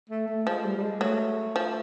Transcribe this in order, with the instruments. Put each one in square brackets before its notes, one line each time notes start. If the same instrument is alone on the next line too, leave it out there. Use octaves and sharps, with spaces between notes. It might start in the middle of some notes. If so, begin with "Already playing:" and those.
[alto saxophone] A3
A3
[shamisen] F3 [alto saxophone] G#3
[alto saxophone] G3
G3
G#3
[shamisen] F#3 [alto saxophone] A3
[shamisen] F3